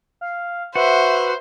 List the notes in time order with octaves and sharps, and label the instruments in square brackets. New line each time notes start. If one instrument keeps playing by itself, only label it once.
[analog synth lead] F5
[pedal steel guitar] F#4 [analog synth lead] B4 [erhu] C5 [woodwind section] E5